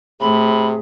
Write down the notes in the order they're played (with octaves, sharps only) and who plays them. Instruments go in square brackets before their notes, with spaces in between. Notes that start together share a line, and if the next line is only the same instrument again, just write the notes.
[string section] A2 [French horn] C3 [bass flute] G#4 [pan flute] B5